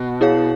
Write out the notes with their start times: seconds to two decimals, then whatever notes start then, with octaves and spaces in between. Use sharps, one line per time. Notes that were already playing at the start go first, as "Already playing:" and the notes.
Already playing: B2
0.21 E4 G#4 C#5 F5